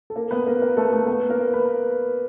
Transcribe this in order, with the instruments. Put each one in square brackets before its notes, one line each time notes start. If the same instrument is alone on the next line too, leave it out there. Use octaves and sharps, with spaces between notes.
[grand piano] A4
A#3 A#4
B3 B4
A#3 A#4
A#3 A#4
A3 A4
A3 A4
B3 B4
A#3 A#4
B4